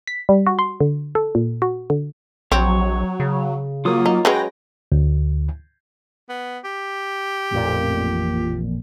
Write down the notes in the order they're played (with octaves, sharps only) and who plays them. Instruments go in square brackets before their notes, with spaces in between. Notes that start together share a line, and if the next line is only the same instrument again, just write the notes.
[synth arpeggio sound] B6
G3
F#4
C6
D3
A4
A#2
F#4
D3
[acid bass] A#1 [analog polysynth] F#3 [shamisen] C4 [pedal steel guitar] C#5
[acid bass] C#3
[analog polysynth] F#3 A#3 [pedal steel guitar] F4 D#6
[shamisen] D#4
[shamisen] F#3 G#3 C#4 [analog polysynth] B4 G5 A#6 [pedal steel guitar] C#5
[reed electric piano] D2
[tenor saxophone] B3
G4
[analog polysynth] A1 F2 A#2